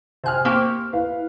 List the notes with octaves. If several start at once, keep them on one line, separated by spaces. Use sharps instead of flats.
C3 C5 G#5 F6 F#6
A#3 C4 G4 C5 C#6 F6
E4 B4 F5